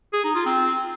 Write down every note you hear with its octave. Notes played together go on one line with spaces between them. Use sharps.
G#4
D#4
F4
C4